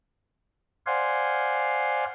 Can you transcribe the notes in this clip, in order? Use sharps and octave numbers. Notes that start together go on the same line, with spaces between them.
C5 D5 F5 F#5 G#5 C6